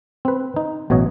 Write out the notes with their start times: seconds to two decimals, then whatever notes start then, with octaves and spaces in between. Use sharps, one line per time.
0.25 C4 B4
0.56 D#4
0.90 A1 B2 F#3 C#5 D#5